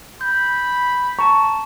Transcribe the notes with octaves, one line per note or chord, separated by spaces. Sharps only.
B5 G6
A5 A#5 C#6